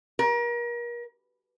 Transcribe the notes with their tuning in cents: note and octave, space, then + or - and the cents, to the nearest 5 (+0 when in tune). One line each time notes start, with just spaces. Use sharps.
A#4 +35